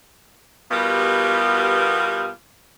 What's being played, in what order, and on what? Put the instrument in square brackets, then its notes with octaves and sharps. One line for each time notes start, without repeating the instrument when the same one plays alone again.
[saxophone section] B2 G3 B3 F4 G4 A#4